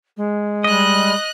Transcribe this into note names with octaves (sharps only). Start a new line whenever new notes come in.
G#3
G3 D#5 D#6 F#6